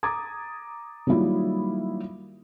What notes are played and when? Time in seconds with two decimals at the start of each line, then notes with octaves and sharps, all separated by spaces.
0.03 A#5 D6 D#6 G#6 A6
1.07 D#3 F#3 G3 A#3 E4 F4